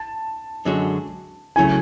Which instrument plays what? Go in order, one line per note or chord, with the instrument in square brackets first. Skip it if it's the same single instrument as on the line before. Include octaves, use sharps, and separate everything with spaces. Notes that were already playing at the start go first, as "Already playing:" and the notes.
Already playing: [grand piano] A5
[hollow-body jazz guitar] F#2 D3 G#3 C#4 F#4
[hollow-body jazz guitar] C#3 F#3 A3 E4 [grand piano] G#5